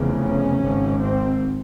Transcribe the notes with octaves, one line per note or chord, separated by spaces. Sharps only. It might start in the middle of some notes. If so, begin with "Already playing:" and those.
Already playing: F1 E2 C#3
C#4
G#1 G#2
C4